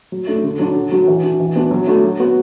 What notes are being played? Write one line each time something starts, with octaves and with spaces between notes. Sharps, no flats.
F#3
A3 D4
D3
F#3 D4 F#4
D3
F#3 D4 F#4
E3
D4 F#4
E3
B3 D4 F#4
F#3
A3 D4 F#4
F#3
B3 F#4